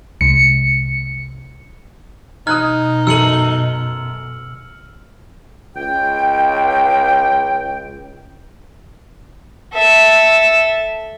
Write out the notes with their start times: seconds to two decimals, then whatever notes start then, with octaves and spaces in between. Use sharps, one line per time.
0.21 C2 G#3 C#7
2.47 B2 D#4 D#6 F6 F#6 G#6
3.07 F#2 A4 E6 C#7 D#7 F#7
5.76 C#2 G5
9.74 A4 E5